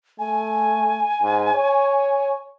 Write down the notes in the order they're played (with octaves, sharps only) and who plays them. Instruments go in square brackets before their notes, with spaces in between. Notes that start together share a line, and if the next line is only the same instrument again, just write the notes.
[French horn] A3 [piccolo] G#5
[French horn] G#2
C#5